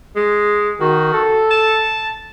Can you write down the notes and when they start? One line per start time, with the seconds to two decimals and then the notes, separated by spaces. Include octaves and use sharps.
0.16 G#3
0.81 D#3 F#4
1.13 A4
1.51 A5